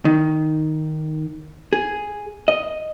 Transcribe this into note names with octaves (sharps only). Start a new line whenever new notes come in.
D#3
G#4
D#5